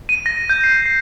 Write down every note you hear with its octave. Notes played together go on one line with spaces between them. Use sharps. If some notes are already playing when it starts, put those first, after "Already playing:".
D#7
A#6
G6
C7
C7